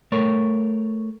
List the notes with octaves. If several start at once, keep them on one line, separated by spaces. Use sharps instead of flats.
A3 A#4 C#5